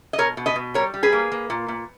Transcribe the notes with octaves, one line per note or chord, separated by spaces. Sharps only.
D#5
B2 A#4 C#5
B2
B4 D#5
B2
G3 A#4 C#5
G3
G#4 B4
A#3
A#3
A#2
A#2